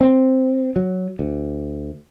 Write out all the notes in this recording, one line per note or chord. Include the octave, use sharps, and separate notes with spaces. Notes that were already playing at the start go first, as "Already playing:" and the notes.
C4
F#3
D2